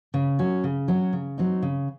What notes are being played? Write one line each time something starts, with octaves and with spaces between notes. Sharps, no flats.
C#3
F#3 C#4 F#4
C#3
F#3 C#4 F#4
C#3
F#3 C4 D#4
C#3